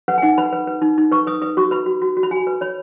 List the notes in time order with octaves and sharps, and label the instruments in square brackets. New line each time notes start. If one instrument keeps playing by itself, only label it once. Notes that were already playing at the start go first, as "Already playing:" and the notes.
[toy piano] B4 F#5
G#5
D#4 F#5
B4 B5
B4
B4
D#4
D#4
B4 C#6
B4 D#6
B4 D#6
F#4 C#6
B4 B5
F#4
F#4
F#4
B5
F#4 G#5
B4
C#5 B5